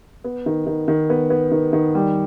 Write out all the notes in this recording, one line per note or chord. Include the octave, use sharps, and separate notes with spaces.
B3
D#3
D#3
D#3
B3
B3
D#3
D#3
G3